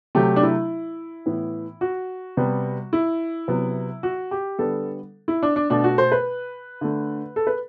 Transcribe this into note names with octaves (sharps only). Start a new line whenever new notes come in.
C3 F#3 A3 G4
D4
E4
A2 E3 B3
F#4
C3 G3 B3
E4
C3 F#3 B3
F#4
G4
D3 G3 B3 A4
E4
D4
D4
B2 A3 D4
F#4
C5
B4
D3 A3
A4
B4